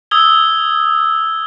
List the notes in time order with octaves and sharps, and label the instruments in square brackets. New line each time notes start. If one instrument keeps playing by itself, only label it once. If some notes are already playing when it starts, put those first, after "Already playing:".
[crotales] D#6 E6 G#6 G7